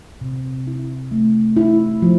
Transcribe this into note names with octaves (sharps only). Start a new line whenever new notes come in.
C3
E4
A3
E4
F3